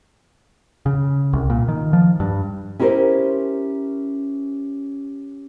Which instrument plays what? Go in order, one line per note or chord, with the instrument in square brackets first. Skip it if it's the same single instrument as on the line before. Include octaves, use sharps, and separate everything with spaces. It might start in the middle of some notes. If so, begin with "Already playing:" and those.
[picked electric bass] C#3
C2
A#2
D#3
F3
G2
[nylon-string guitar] C#4 E4 G4 A#4 C5